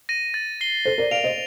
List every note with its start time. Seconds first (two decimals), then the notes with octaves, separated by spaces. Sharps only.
0.09 A#6 D#7
0.34 A6
0.61 C7 G7
0.85 A4 C5 A6
0.98 A#4 D5
1.11 D5 F5 D7 F7
1.24 C5 D#5